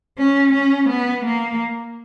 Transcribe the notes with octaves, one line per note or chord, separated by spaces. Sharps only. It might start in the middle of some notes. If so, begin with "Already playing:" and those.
C#4
C#4
B3
A#3